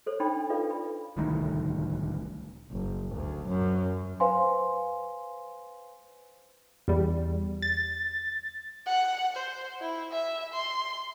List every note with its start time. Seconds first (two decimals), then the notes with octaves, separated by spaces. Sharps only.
0.06 A4 C5 C#5
0.20 D4 D#4 G5 A5 B5
0.36 D4
0.50 F4 A4 B4 D5 F5
0.71 B5
1.17 D1 C2 A2 D#3
2.71 F#1
3.14 D2
3.48 F#2
4.20 B4 C5 F5 G#5 C6
6.88 E2 G3
7.62 A6
8.86 F#5
9.36 C5
9.81 E4
10.12 E5
10.54 C6